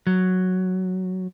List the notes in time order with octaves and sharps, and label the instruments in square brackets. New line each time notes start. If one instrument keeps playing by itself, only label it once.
[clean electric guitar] F#3